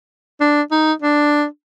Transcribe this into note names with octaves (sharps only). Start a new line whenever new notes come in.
D4
D#4
D4